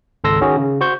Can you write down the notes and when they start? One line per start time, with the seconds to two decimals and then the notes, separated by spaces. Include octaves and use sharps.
0.24 G#1 C#2 A4 C6 E6 A#6
0.41 D#3 C#4 F#4 G#4
0.57 C#3
0.81 F#4 C5 C#6 G6